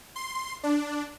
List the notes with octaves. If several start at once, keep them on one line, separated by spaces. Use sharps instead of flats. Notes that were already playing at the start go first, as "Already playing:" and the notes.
C6
D4